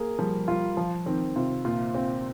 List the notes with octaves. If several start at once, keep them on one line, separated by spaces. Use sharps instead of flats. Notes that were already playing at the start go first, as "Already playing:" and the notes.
Already playing: A#3 G#4
F3 G3
G3 F4
F3
D#3 C4
C3 F4
A#2 F4
C4